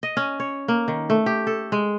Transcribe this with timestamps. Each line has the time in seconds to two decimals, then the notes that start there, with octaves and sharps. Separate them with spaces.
0.03 D#5
0.17 C#4
0.40 C#5
0.68 A#3
0.88 D#3
1.10 A3
1.26 G4
1.47 A4
1.72 G#3